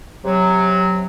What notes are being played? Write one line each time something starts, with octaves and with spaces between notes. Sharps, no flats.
C3 F#3